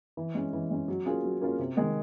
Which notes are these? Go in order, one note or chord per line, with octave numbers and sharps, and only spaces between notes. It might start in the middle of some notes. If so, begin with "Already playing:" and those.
E3
G#3 C#4
E3
G#3 C#4
F#3
A#3 C#4 F4 G#4
F#3
A#3 C#4 F4 G#4
C3
D#3 G#3